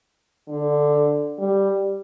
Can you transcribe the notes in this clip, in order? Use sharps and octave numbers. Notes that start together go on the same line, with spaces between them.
D3
G3